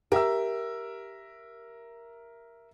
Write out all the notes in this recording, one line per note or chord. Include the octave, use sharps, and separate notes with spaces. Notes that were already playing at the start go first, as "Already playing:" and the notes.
G4 A#4 E5 E6